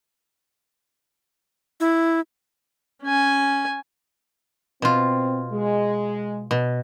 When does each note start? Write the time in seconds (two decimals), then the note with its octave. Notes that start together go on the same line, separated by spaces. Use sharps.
1.80 E4
3.04 C#4 G#5
4.82 B2 C4 F4
5.51 G#3
6.51 B2